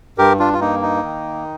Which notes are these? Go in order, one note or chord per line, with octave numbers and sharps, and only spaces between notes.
G2 G4 A#4
D4 F4
F4
A#3 D#4
D#4
D#3